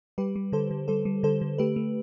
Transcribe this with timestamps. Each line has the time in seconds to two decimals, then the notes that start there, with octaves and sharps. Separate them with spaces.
0.18 G3 G4 B4
0.36 G3
0.52 D3 A4 C5
0.71 D3
0.88 G3 A4 C5
1.05 G3
1.23 D3 A4 C5
1.41 D3
1.58 A3 G4 B4
1.76 A3